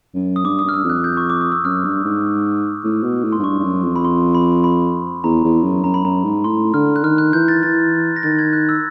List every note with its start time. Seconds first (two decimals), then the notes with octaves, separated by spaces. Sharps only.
0.15 F#2
0.36 D#6
0.45 G2 D6
0.59 D#6
0.64 G2 F6
0.74 E6
0.84 F2
0.90 F#6
1.04 G6
1.17 C#6
1.30 D6
1.41 D#6
1.52 E6
1.64 F#2 F6
1.84 G2
2.04 G#2
2.84 A2
3.04 B2
3.24 A2
3.32 C6
3.39 G#2
3.44 G2 C#6
3.59 G2
3.64 F#2
3.84 F2
3.96 B5
4.05 C6
4.35 B5
4.64 B5
5.24 E2 A#5
5.44 E2
5.64 F#2
5.84 F#2 A#5
5.94 B5
6.04 F#2 A#5
6.24 G#2
6.44 A2 C6
6.74 D3 F6
6.96 F#6
7.03 D#3 F6
7.18 F#6
7.33 E3 G6
7.48 A6
7.63 E3 A6
8.16 A#6
8.23 D#3 A6
8.39 G#6
8.53 F#6
8.69 E6